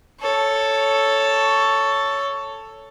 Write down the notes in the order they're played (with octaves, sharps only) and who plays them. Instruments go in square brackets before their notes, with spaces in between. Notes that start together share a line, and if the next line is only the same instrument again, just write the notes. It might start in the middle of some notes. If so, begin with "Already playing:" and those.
[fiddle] A4 C#5